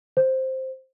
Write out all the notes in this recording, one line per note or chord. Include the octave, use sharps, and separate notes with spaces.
C5